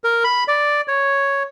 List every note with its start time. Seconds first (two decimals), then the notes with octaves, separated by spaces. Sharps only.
0.04 A#4
0.24 B5
0.48 D5
0.88 C#5